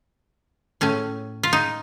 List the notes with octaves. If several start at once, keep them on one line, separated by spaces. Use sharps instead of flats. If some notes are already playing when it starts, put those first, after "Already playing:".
A2 A3 C#4
F4
D#4